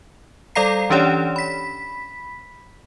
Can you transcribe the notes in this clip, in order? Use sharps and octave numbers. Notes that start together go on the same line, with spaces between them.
G3 A4 D5 F5 A#5 C7
E3 C#4 D4 G4 C#5 D5
B5 B6